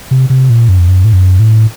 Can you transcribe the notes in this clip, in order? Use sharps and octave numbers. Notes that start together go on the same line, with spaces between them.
C3
C3
A#2
F#2
F2
F#2
A2
F#2
A2